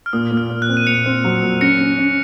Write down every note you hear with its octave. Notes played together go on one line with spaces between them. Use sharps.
F6
A#2 D#6
A#2
F6
A#2
F#6
C4
D#7
A#2 C#7 F7
C4
F#3
A#2
C#4 A#6 C#7
C#4
C#4